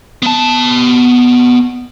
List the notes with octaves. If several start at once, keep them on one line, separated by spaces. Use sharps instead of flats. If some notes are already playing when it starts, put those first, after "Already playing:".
B3 A5